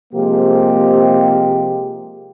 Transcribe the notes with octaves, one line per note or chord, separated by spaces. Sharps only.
C3 F3 G#3 A#3 G4